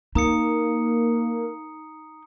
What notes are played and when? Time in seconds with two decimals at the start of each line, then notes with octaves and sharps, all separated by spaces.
0.15 A#3 D#4 A#5 D#6 C#7